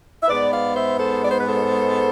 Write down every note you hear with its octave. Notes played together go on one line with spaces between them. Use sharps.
E5
G#2 G#3 B3 B4 D5
D5 F5
C5 E5
A4 C5
D5
C5
B4
A4 C5